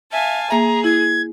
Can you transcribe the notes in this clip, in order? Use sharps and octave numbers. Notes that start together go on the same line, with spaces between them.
E5 F5 G#5 A5
A#3 G#4 E5 A#5
E4 G#6